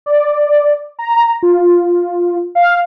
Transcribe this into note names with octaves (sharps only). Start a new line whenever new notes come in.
D5
A#5
F4
F5